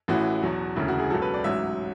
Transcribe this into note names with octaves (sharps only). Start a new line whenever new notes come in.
A1 A2 E3 F#4
E2 B2 F#3
E1 D2 C#3 E4
F#4
G#4
C#2 B2 F#3 A4
B4
D5
A1 G#2 F#3 E5